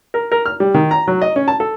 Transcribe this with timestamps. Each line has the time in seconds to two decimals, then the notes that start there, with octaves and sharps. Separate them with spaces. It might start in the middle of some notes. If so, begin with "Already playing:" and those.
0.14 A#4
0.32 A#4
0.46 F6
0.60 G3
0.74 D#3
0.91 A#5
1.08 F#3
1.22 D#5
1.36 C#4
1.48 A5
1.60 A4